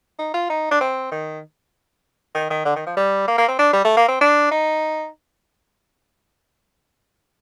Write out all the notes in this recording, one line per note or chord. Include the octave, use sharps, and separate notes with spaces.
D#4
F4
D#4
D4
C4
D#3
D#3
D#3
D3
D#3
F3
G3
A#3
A#3
C4
D4
G3
A3
A#3
C4
D4
D#4